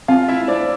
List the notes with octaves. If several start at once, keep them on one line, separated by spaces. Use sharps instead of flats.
C4 F4 F5
C4 E4 E5
D4 C5 D5